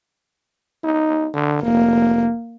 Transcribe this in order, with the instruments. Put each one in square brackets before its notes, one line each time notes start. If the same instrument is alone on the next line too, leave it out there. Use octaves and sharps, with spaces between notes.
[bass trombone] D#4
D3
[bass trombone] F1 [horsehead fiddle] A#3